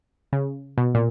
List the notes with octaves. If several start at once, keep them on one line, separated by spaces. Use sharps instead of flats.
C#3
B2
A#2